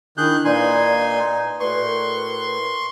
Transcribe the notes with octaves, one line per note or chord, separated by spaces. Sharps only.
D#3 D4 E4 G#4 B5 F#6 G6
A#2 D#4 B4 D5 F5 G#5 C6
A2 F#4 B4 D5 C6 C#6
A#4